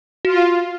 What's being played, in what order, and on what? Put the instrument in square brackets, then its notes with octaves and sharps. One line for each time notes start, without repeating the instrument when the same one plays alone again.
[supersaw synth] F4 [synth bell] F#4